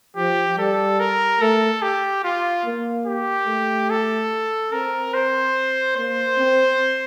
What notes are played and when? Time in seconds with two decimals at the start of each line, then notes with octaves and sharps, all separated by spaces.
0.16 F3 G4
0.58 G3 A4
1.00 A#4
1.40 A3 A4
1.82 G4
2.23 F4
2.66 A#3
3.06 G4
3.47 A3
3.90 A4
4.72 C4 A#4
5.14 C5
5.97 A#3 C5
6.38 C4